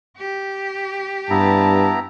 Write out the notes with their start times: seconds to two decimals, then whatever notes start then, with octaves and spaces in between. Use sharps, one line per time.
0.18 G4
1.30 G2 B3 E4 A5 A#5